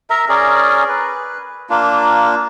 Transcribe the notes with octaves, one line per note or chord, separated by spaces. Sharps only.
A#4 E5 A#5
C#4 G#4 A#4 D5
B4
A#3 D4 F4